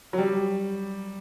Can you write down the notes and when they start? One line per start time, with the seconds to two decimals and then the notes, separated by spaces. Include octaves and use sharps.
0.13 F#3
0.18 G3